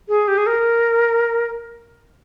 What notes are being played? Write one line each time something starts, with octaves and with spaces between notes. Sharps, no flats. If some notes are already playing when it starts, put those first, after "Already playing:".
G#4
G4
G#4
A#4